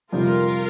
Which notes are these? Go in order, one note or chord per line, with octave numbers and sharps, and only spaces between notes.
F2 C3 G3 D#4 F4 A#4